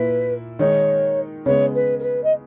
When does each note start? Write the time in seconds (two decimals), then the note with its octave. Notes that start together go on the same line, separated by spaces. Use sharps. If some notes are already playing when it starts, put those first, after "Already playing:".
Already playing: A#2 A#3 E4 B4
0.59 D#3 G#3 D#4 C#5
1.45 C#3 G#3 B3 C#5
1.74 B4
1.99 A#4
2.03 B4
2.23 D#5